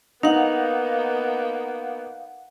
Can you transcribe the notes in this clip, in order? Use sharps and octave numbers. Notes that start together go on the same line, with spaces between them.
A#3 B3 D#4 F5 F#5